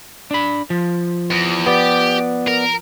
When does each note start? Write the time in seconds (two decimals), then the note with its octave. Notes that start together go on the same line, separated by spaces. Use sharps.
0.31 D4 B5
0.70 F3
1.30 E2
1.66 B3 G4 D5
2.47 A#4